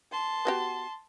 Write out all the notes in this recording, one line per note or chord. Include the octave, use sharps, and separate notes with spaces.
A5 C6
B3 F#4 G4